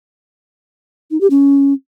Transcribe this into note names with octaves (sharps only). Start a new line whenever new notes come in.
D#4
G4
C#4